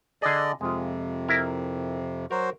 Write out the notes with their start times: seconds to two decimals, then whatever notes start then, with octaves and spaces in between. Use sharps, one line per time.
0.22 D3 G#4 D5 D#5
0.61 F2 C3 G#3 F4
1.29 E4 A#4
2.31 F#3 F#4 A#4 C5